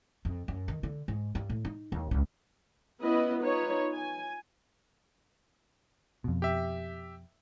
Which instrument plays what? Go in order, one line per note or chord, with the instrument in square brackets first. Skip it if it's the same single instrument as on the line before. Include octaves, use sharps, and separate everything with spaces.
[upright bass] F2
F#2
D#3
D3
G#2
G2
A2
D#4
D#2
C#2
[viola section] B3 C#4 E4 B4 D#5
D#4 F4 B4 C#5
G#5
[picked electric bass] F2 B2
[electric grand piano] G4 E5